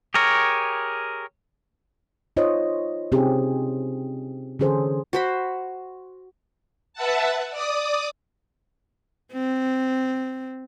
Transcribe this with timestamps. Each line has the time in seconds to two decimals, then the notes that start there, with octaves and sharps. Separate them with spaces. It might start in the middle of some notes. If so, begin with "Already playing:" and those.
0.14 G4 G#4 A#4 C#5
2.37 D#4 F4 C5 C#5 D#5
3.12 C3 C4 C#4 D#4 G4 G#4
4.59 D3 E3 C#4 G#4 A4 C5
5.13 F#4 C5 B5
6.93 B4 E5 F#5 A5
7.51 D5 D6 D#6
9.33 C4